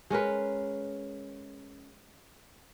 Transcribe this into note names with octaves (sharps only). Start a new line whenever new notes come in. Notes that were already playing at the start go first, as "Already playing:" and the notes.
G#3 C#4 A#4 B4